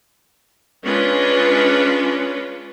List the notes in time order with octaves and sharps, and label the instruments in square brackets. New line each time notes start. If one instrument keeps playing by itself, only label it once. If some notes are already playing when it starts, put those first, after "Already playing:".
[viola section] G#3 C#4 D4 F4 B4